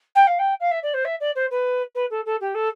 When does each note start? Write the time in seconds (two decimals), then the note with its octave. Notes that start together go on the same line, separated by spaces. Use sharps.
0.15 G5
0.27 F5
0.39 G5
0.60 F5
0.71 E5
0.83 D5
0.94 C5
1.05 E5
1.20 D5
1.35 C5
1.51 B4
1.95 B4
2.10 A4
2.25 A4
2.40 G4
2.54 A4